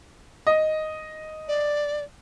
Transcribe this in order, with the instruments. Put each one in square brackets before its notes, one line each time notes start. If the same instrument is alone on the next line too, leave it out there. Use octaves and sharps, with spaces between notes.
[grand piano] D#5
[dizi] D5